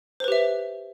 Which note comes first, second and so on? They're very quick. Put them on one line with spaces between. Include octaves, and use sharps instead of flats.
C5 B4 G4 E5